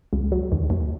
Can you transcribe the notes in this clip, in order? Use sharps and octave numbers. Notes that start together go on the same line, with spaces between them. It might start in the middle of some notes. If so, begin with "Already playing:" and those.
C#2
F#3
D#2
D#2